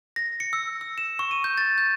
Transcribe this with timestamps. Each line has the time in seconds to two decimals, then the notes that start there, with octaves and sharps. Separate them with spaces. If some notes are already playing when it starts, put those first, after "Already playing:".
0.16 A#6
0.40 C#7
0.53 E6
0.81 E6
0.98 E7
1.19 C#6
1.31 D#7
1.44 G6
1.58 A6
1.78 G6